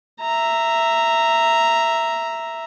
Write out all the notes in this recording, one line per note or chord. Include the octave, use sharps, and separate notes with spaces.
E5 A#5